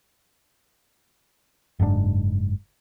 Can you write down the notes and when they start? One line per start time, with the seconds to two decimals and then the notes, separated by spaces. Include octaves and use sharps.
1.79 F#1 G#2 C#3 D4